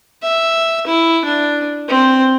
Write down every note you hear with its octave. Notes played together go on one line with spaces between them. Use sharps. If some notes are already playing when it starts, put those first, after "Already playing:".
E5
E4
D4
C4